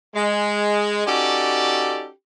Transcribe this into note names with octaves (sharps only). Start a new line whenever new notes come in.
G#3
C#4 D#4 F#4 G4 A4 D5